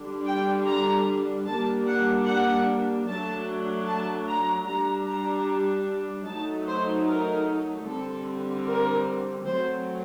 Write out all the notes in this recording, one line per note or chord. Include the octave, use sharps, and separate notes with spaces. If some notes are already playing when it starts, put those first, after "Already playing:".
Already playing: D3 G3 D4
G5
A#5
G3 A#3 D4 A5
F#5
F#5
F#3 A3 D4 A5
A5
A#5
G3 D4 A#5
A#5
F#3 A3 D#4 A5
C5
A#4
D3 G3 C4 A4
A#4
F#3 A3 C4 C5